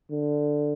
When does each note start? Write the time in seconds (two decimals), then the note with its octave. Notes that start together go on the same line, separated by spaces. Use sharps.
0.11 D3